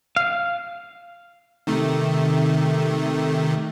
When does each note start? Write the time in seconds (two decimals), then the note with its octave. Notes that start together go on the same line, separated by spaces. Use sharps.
0.16 F5
1.67 C3 D#3 A3